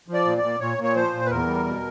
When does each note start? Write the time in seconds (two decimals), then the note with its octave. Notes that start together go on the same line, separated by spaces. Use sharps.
0.08 F3
0.14 D5
0.25 A#2
0.38 D5
0.43 A#2
0.60 A#2 C#5
0.78 A#2
0.84 C#5
0.95 F3 C5
1.13 A#2
1.26 B4
1.31 E2 A#4
1.47 G3
1.66 B2